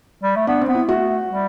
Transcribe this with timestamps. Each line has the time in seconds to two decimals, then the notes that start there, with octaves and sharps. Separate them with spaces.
0.23 G3
0.36 A3
0.47 B3 D4
0.61 C4
0.68 B3
0.75 E4
0.88 A3 F#4
1.28 G3